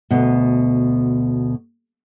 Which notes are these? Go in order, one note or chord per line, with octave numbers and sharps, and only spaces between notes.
D2 B2